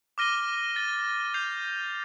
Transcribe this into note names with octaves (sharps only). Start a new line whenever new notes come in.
D6 F6 A#6 D#7 G7
A6 D#7 G7
G6 C7 F7